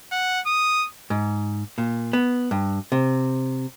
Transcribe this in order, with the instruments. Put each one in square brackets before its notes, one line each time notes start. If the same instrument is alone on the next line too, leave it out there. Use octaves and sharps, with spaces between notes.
[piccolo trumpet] F#5
D#6
[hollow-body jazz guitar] G#2
A#2
B3
G2
C3